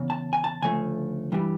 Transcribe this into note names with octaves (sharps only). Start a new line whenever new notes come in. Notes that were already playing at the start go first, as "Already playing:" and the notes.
Already playing: E2 C#3
A5
G#5
A5
D2 C#3 F3 A3 G#5
G2 E3 G3